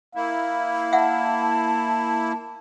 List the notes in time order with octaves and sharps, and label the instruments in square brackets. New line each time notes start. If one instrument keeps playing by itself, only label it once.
[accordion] A#3 E4 [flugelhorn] F5
[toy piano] E5 F#5 [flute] A5